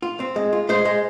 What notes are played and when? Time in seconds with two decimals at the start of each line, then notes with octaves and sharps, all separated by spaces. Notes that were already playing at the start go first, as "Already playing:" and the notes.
0.02 F4
0.20 C4
0.36 G#3
0.53 F4
0.69 G#3 C5
0.85 G#3